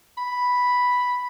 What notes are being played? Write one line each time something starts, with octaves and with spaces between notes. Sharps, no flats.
B5